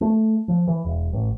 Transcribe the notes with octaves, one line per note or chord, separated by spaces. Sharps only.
A3
F3
E3
E1
A1